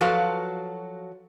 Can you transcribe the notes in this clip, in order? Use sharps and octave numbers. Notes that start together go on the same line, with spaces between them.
F3 F#3 F#4 A4 B4 F5